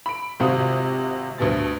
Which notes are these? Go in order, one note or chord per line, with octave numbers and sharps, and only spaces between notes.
B5 D7
G#1 C3 F4 F#4 D#6
D2 G2 B2 A6